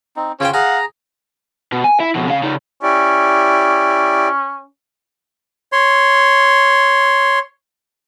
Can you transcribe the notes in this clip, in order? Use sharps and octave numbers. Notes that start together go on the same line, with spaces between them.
C4 D#4
C#3 C#4 F4 C5 G5
G#4 F5 F#5 A#5
B2
G#5
E4
F2 B2
C#3 F5
C#3 D#4
C#4 E4 G4 D5
C#5 C6